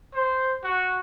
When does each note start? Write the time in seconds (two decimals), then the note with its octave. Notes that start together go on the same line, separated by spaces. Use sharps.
0.14 C5
0.64 F#4